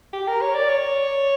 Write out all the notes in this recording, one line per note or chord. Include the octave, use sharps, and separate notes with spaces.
G4
A#4
C#5
D5
C#5